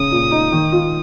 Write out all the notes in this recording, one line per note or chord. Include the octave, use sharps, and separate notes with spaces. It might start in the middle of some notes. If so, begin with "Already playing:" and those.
Already playing: C#3 D#6
A#2
D#4
D#3
F4